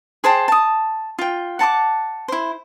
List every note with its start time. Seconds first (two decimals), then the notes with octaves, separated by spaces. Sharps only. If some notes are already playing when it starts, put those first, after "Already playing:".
0.24 G#4 C5 G5 A5
0.48 A5 D#6
1.19 F4 G5
1.59 F#5 A5 C6 D6
2.28 E4 C5